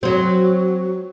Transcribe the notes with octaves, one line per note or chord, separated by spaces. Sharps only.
F#3 C4 F#4